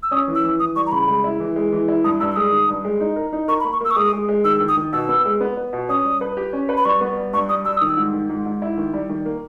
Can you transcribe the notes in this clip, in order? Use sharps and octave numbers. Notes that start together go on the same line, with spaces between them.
E6
C#4 D#6
E3
E6
E3
E3 D#6
G3 C#6
A#5
C#3 B5
G#3
E4
E3
G#3
E3
E4
G2 D#6
G2 E6
E6
G#3 D#6
D#3
G2
G#3
D#4
A#4
D#4
A#4 C#6
B5
A#3
C#6
A#3 E6
C#6
G#3 D#6
G#3
G#3
D#3 E6
D#3
D#6
D#3
B2 E6
B3
G#3
B3
B3
B2
C#4 D#6
G3
B4
G4
C#4
B4
B5
G3 C#6
B3
G3
G2 C#6
G3 D#6
G3 E6
D#3 D#6
E6
G#2
D#3
G#2
G#2
E4
D#3
G3
D#3
A#3